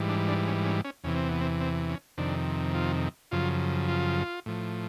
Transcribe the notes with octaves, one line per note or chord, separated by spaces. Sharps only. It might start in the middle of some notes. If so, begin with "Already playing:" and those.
Already playing: G#2 E3 G3
D4
D4
C#4
C#4
C#4
E2 C3 E3 C#4
C4
B3
C4
C4
C#4
F2 C3 D#3 D4
F4
F#2 C#3 F3 F4
F4
A2 F3